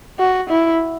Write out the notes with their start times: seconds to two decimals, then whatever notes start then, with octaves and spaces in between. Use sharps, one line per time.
0.19 F#4
0.49 E4